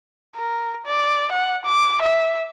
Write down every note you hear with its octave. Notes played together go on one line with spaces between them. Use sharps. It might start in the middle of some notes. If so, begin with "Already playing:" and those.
A#4
D5
F#5
D6
E5